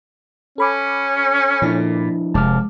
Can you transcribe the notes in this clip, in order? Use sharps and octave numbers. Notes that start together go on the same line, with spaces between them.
C#4 A4 B5 D6
A#2 F3 D4 E4
F1 G#3 A5 D6 F6